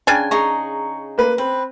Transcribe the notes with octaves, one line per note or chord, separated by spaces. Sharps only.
C#3 D4 G5 G#5
D#4 G#4 A#5 C#6
A#3 B4
C4 B4